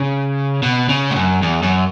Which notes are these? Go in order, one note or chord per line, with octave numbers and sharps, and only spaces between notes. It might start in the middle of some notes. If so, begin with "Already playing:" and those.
Already playing: C#3
B2
C#3
A2
F#2
E2
F#2